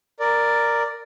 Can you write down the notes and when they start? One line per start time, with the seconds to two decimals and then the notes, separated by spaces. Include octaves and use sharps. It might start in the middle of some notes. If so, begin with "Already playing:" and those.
0.20 A#4 D5